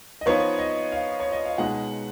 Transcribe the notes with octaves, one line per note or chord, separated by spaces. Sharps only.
D#5
F3 B3 D#4 C#5
D#5
F5
C#5
D#5
F5
B2 G#3 D#4 F#5